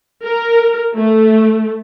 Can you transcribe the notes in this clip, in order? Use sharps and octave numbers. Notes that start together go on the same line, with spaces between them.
A#4
A3